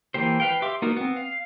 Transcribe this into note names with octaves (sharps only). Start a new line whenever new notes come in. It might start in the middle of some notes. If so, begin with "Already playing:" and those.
E3 A#3 G4 C5
B4 F5 G5
G4 E5 C6 D6
A#3 B3 D#4 F#4 A#4
B3 C4
F5